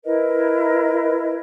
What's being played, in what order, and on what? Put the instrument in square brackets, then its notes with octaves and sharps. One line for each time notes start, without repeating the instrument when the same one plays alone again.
[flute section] E4 A#4 B4 D#5